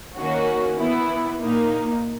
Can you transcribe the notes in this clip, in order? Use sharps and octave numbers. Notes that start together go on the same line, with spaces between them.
D#3 A#3 C#4 F#4
E3 B3 E4
A#2 A#3 D#4